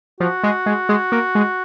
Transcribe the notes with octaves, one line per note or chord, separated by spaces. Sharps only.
F3 F#4
G#3
G#3
G#3
A#3
G#3